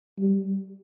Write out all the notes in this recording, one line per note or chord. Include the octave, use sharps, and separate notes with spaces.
G3